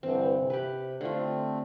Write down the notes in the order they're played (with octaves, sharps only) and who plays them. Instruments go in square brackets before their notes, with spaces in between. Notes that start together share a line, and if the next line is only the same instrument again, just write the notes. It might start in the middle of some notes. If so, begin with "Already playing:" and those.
[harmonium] G2 D3 E3 [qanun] C4
[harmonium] C3
[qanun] G4 B4
[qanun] D3 F4 [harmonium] A3 C4